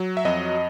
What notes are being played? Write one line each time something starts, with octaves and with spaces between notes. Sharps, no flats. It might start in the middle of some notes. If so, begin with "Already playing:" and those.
Already playing: F#3
E5
F2 D#5